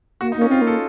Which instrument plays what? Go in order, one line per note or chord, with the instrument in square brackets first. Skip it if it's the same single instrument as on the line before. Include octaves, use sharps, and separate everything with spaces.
[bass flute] A#3 [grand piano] F#4
[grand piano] D#4
[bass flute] A#3 [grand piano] C#4
[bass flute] C4 [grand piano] F4
[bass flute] A#3
[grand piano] A4